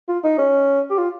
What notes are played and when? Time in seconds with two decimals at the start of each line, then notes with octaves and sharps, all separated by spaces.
0.08 F4
0.24 D#4
0.38 C#4
0.90 G4
0.98 F4